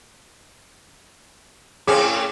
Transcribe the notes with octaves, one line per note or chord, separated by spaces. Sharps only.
A2 C4 C#4 G#4 D6